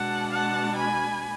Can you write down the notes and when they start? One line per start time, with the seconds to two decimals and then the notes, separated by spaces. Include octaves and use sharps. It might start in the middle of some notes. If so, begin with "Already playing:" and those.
Already playing: B2 G#3 D4 F#5 A5
0.31 F#5 A5
0.77 G#5 B5